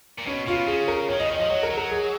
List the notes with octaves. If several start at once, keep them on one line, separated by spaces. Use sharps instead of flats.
A#2
B2 C#4
B2 F4
C#3 G#4
A#4
D#3 C#5
C#3 D#5
D#3 D#5
F3 D#5
F#3 C#5
A#4
F#3
A#4
G#4